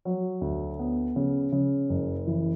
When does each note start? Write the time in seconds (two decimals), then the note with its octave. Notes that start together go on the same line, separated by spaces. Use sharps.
0.05 F#3
0.41 D2
0.79 B3
1.16 C#3
1.52 C#3
1.89 F#1
2.27 E3